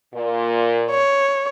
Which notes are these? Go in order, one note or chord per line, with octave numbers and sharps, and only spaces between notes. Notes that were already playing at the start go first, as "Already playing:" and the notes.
A#2
C#5